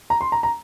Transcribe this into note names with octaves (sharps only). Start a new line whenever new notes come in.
A#5
C6
A#5
A#5